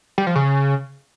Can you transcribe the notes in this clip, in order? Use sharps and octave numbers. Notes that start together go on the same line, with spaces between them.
G3
F3
C#3